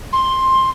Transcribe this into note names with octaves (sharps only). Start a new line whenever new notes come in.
C6